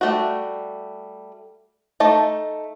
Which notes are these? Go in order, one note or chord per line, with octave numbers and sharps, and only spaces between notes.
G3 A3 F#4
A3 D#4 A5